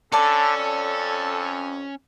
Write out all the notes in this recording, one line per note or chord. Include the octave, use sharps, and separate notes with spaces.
D3 C#4 A4 D5 A5 D6
F2